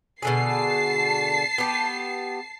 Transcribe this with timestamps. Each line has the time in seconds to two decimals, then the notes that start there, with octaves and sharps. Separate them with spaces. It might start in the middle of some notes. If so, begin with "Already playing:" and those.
0.22 B2 D3 G#4 A5 C7
1.58 B3 G4